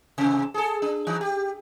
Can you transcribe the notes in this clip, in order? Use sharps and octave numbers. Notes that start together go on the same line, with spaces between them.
G#2 C3
G#4 A4
D4
E3 D#4
G4